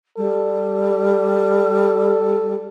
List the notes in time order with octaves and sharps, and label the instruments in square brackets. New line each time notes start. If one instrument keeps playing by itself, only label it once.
[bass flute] G3 [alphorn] A4